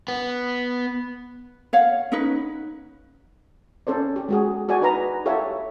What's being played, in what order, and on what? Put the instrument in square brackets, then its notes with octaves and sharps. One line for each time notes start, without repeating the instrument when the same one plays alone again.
[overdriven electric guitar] B3
[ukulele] C#5 F5 F#5
C#4 D#4 B4
[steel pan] C#4 A4 C5 D5
G4
G#3 F#4 G#4
F#4 G#4 D5 G#5
D#4 B4 A#5
F4 G4 A4 C#5 E5 F#5